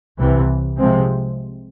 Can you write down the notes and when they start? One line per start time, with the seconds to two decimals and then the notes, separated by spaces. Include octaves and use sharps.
0.19 C2 C3 E3
0.77 C3 F3 G#3 C4